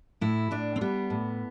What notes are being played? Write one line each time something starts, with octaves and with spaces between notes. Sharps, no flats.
A2 E4
A2 D4
C4
G3 B3
A2